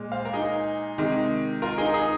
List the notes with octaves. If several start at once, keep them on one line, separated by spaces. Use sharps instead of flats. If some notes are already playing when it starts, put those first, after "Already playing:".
Already playing: A#2 G#3
C5 F5
A#4
D#4 G#4
C3 D#3 G#3
F4 A#4
D#4 G#4
D#4 G#4